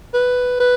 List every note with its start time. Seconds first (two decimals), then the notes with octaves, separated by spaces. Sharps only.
0.14 B4
0.60 B4